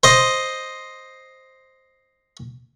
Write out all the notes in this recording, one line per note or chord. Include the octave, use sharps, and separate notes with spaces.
C5 D#5